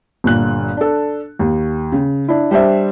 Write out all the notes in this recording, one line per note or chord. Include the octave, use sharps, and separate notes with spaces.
G1 A#2 F#6
D4 A4
D#2
C#3
D4 E4
G3 D4 C5 E5